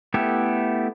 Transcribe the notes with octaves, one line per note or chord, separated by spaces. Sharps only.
A3 B3 E4 G4 A4